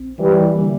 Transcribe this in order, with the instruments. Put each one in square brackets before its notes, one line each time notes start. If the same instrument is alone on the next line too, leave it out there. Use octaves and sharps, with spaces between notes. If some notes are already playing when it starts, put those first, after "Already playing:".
Already playing: [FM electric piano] A#1 C4
[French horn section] E3 G3
[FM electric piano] D3 G3 A#3